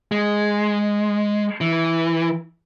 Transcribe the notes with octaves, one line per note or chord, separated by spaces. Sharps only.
G#3
E3